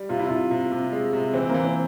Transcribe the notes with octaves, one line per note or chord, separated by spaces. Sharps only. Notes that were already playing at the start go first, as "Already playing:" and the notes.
Already playing: G3
C3 F4
E4
C3 F4
C3
C3
G#3
C3
E3 C4
A#3
E3
C4